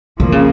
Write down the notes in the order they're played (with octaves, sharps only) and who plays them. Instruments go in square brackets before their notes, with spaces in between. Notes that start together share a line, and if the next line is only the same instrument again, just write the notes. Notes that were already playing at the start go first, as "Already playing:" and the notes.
[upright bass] D3 [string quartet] F3 A#3
[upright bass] C#3